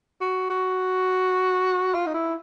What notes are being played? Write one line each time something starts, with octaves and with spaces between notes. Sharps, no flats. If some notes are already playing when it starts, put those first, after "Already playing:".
F#4
F#4
F4
D#4
E4